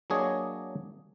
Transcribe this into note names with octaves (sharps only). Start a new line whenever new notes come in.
F#3 A#3 D4 G#4 C#5 D#5